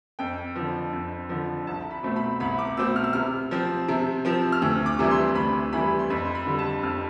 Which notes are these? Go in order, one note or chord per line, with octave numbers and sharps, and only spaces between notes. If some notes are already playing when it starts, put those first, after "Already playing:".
F2 G5
D3 F3
F2
D3 F3
C2 A5
B5
B2 A3 C4
B5
C2 B5
D6
B2 A3 C4 E6
F6
E6
C3 F6
F3 C4
C3
F3 C4
F6
D2 E6
D6
C3 E3 G3
C6
D2 B5
C3 E3 G3 B5
C6
F2 B5
C6
B5
D3 G3
A5
F2 F6